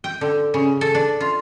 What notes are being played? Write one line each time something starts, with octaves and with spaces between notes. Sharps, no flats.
G5
D3
C#3
A4
D4
F4